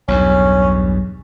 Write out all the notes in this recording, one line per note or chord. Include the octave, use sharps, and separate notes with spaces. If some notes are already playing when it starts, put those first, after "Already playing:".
B1 E2 G2 C#4